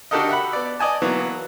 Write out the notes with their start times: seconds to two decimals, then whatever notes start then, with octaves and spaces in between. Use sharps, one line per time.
0.11 D4 F#4 G4 A4 A#4 D#5
0.29 E5 F#5 B5
0.53 B3 D5
0.79 D5 D#5 G#5 A5
1.02 E3 F#3 A#3 B3